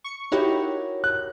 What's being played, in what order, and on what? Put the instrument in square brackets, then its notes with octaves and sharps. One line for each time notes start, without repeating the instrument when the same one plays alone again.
[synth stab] C#6 C#7
[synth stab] D#4 E4 G4 [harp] F#4 A#4 C#5
[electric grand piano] F#6